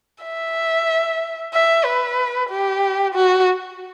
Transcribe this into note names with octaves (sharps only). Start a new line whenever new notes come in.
E5
E5
B4
G4
F#4